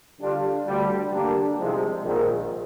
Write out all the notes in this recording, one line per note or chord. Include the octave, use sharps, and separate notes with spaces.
D3 G3 D4 F4
D2 D3 G3
D3 G3 A#3 D4
C2 C3 F3 G#3
A#1 G#2 D#3